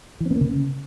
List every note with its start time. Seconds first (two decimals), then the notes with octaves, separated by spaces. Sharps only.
0.20 E3
0.26 C4
0.31 B3
0.36 A#3
0.41 C#3